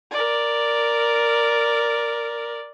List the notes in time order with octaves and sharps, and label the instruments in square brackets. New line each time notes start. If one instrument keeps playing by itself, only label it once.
[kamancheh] A#4 D5